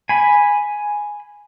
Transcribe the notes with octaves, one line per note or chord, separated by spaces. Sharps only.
G#5 B5